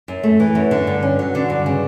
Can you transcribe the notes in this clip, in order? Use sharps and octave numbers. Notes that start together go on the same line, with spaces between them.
F#2
A3
E3
F#2
D3
G2
C#4
F#3
D3
G2
C#3